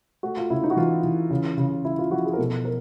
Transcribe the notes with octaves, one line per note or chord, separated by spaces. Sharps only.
A3 F#4
F4
C#3 E4
D#4
F#4
E3 F4
E3
C#3
C#3
C#3 E4
F4
F3 F#4
G#4
A#4
B2 A4
A#4